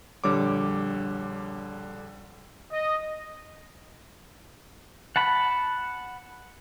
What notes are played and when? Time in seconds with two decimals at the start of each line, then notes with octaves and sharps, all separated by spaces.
0.24 A#1 D3 G3 C#5 D6
2.72 D#5
5.16 F#5 A5 B5